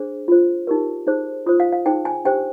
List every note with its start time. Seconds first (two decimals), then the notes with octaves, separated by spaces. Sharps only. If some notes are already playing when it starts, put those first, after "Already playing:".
Already playing: D4 G#4 C5
0.28 F4 C5
0.67 D#4 G4 A#4
1.07 D#4 G#4 C5
1.46 F4 C5 D#6
1.60 F5
1.72 F5
1.86 D#4 G#4 C5 G5
2.05 G#5
2.25 D4 G4 C5 G5